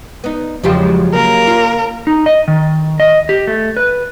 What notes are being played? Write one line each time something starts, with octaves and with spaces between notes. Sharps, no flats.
B3 D#4
E2 C#3 F3 F#3 G#3 G4
C#3 A#3 A#4
F4
D#4
D#5
D#3
D#5
G4
A3
B4